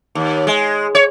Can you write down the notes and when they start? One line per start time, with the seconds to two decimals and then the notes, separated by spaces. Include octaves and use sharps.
0.15 D#2
0.47 G#3
0.95 C#5